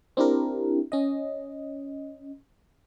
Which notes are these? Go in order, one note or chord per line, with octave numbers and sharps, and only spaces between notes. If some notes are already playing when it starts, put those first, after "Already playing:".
C4 D4 E4 G4 A#4
C#4 D#5